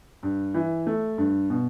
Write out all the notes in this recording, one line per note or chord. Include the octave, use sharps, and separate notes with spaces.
G2
E3
A3
G2
B2